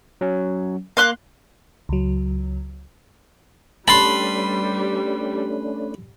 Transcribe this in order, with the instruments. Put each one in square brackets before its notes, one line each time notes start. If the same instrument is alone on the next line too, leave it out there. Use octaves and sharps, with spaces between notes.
[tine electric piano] F#3 C#4
[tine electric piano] A#3 [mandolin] F5 C6 F#6
[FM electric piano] C#2 F#3
[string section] G3 [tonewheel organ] A3 C#4 D4 [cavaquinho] B4 A5 [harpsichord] B5 C6